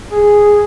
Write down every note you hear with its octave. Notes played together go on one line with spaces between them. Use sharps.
G#4